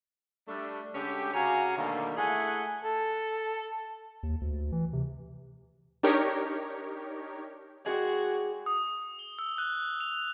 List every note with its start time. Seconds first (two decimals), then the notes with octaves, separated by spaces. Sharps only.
0.48 G3 A3 D4
0.95 D3 G#3 C#4 G4
1.34 C#3 F#4 C#5 F5 G#5 A#5
1.78 B2 D3 D#3 G3 A3 A#3
2.17 A3 E4 G#4 F#5 G#5
2.84 A4
4.23 D#2
4.41 D2
4.72 E3
4.93 C3
6.03 D4 D#4 G4 A#4 C#5
7.86 G#3 F#4 G#4 D5 G5
8.66 D#6
9.19 G7
9.39 E6
9.58 F#6
10.00 F7